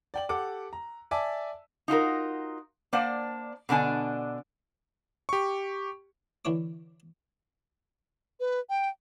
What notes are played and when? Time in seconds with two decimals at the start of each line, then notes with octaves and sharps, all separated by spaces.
0.14 D5 G5 F#7
0.29 G4 A4 F#5 D6
0.73 A#5
1.11 D5 E5 G#5 A5 D6
1.88 D#4 F4 F#4 A#4
2.93 A#3 D4 C5 D5 F#5
3.69 B2 D3 D4 G#5
5.29 G4 C#6
6.45 D2 E3 D4 E4 C#5 D6
8.40 B4
8.70 G5